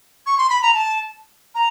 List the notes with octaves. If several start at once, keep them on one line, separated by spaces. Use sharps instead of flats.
C#6
C6
B5
A#5
A5
A#5